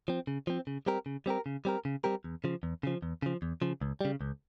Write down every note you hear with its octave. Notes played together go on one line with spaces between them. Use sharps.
F3 C4
C#3
F3 C4
C#3
G3 C4 G4 A#4
C#3
G3 C4 G4 A#4
C#3
G3 C4 G4 A#4
C#3
G3 C4 G4 A#4
E2
C#3 F3
E2
C#3 F3
E2
C#3 F3
E2
C#3 F3
C#2
C#3 G3
C#2